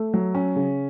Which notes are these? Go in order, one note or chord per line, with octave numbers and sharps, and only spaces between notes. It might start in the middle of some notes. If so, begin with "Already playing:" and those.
Already playing: A3
F#3
C#4
C#3